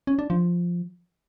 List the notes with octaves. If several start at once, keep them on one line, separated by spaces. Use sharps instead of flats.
C#4
D4
F3